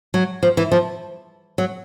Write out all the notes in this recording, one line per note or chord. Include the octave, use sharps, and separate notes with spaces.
F#3
F3
E3
F3
F#3